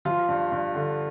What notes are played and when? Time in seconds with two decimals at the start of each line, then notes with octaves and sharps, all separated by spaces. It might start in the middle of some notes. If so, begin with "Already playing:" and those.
0.05 F3 F4
0.29 G2
0.52 G2
0.75 D3